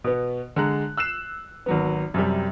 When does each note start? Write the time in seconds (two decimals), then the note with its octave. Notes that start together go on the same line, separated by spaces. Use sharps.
0.04 B2 B3
0.56 D3 G#3 A#5 F#6
0.97 E6 F#6 C7 E7
1.66 G#1 F#3 B3
2.14 F#2 C3 G3